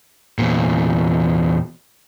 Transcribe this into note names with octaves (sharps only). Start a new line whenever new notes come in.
E2 A#2